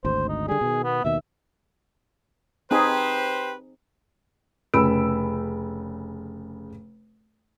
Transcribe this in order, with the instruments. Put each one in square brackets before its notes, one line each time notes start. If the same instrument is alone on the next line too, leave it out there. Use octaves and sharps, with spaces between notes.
[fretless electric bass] G#1 D2 [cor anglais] C5
[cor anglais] D#4
[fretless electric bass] D3 G3 [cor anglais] G#4
[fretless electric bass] B2 D#3
[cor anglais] B3
[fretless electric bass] D#2 B2 D#3 [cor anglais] E5
[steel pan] C4 D#4 G#4 [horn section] G4 B4 C5
[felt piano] F1 C#3 B5 E6 D7